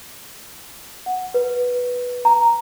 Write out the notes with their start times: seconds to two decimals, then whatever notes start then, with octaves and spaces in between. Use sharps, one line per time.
1.06 F#5
1.34 B4
2.25 A#5